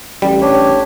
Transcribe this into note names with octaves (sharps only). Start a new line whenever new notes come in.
A1 G3
D4 G4 C#5